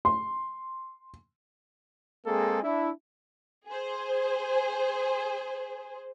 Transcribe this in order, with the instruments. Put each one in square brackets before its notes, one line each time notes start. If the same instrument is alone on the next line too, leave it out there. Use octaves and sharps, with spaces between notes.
[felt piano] C6
[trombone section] G#3 A#3 C4 G#4 A4
D4 E4
[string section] G#4 C5